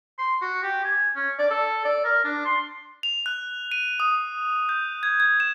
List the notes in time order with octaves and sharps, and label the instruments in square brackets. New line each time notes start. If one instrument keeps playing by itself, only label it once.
[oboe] C6
F#4
G4
G#5
C#4
D5
A4
D5
A#4
D4
C6
[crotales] F7
F#6
D#7
D#6
G6
G#6
G#6
E7